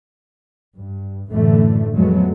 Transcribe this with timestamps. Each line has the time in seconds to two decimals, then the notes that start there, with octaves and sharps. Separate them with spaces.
0.78 G2
1.30 F#2 A2 D3 E3 A3
1.94 F2 F3 F#3 G#3 A3 B3